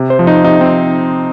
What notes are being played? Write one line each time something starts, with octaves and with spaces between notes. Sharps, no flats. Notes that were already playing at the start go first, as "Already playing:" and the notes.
Already playing: C3
C5
F3
D#4
C3 D#4
C4